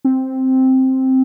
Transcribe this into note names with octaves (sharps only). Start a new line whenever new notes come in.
C4